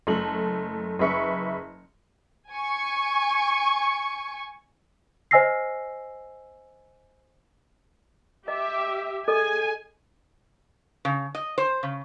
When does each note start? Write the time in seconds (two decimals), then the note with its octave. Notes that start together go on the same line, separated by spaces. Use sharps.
0.07 F#1 A3 F#7
0.99 F#1 G#4 B4 E5 C#6 C#7
2.48 G#5 C#6
5.31 C5 D#5 G#5 E6 A#6 C7
8.48 G4 D#5 E5
9.28 G#4 A4 D#5 G#5
11.05 C#3
11.35 D#5
11.58 C5
11.83 C#3